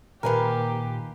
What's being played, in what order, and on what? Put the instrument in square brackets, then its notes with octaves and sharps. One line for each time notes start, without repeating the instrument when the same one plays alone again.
[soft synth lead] A#2 [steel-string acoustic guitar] D#3 F5 G#5 [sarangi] G4 [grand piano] A#4 B4